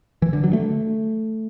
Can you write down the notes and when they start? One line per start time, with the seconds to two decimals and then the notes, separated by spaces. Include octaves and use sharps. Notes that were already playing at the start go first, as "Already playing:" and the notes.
0.22 E3
0.33 D3
0.44 F#3
0.53 A3